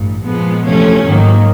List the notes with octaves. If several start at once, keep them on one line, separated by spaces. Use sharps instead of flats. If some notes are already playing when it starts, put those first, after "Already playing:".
Already playing: A1 G2
A#2 F3 G#3 B3
E2 C3 F3 A3 C#4
G#2 D#3 F#3 A#3